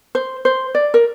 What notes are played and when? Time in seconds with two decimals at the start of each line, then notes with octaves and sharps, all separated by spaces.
0.15 C5
0.45 C5
0.75 D5
0.94 A#4